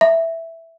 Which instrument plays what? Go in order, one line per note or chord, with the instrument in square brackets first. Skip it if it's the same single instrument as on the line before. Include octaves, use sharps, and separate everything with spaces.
[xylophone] E5